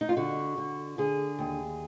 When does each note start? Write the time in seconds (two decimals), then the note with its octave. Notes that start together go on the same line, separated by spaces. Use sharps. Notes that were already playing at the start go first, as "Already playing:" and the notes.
0.01 D#4
0.09 F4
0.17 D3 F#4
0.57 D3
0.98 D3 G#4
1.39 D#2